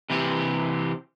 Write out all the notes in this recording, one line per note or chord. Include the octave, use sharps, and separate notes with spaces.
C3 E3 C4 G4